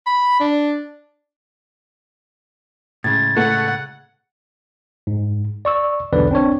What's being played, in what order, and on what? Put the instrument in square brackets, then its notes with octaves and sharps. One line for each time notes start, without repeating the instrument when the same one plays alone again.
[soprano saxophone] B5
D4
[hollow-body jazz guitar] A2 C#3 G#3 [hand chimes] G#6 A6
[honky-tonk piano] A3 [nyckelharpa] F#5
[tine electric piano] G#2
D5 C#6 E6
B1 E2 D3 B4 D5
C4 D4 C#5